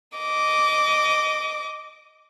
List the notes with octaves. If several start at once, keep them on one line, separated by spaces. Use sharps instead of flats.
D#5 D6